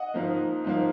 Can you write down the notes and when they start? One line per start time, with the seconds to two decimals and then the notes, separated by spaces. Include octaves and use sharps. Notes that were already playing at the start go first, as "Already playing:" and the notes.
Already playing: D#5 F#5
0.14 G#2 F3 A#3
0.64 G#2 F3 A#3